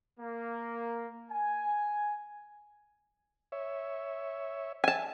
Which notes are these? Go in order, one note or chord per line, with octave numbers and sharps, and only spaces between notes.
A#3
G#5
C#5 E5
E5 G#5 A5